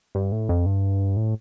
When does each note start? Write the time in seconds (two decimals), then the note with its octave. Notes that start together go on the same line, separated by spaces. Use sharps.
0.15 G2
0.32 A2
0.49 F2
0.66 G2
1.17 A2